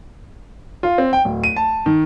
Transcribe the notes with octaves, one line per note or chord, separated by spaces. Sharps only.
F4
C4
G5
D1
D#7
A5
D#3